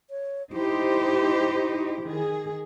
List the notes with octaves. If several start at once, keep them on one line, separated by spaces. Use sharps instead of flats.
C#5
D#4 E4 G4 C5
D#3 G#4